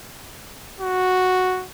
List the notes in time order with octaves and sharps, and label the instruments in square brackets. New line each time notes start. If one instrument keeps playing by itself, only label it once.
[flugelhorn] F#4